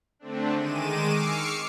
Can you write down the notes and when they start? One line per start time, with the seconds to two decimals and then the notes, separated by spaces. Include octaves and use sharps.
0.19 D3 A3 C4 D4
0.56 D#3 G#3 D6 D#7 E7
1.10 C#6 D6 E6 F6 C7 C#7